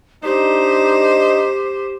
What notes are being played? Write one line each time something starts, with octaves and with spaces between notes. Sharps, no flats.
D4 D#4 G4 C5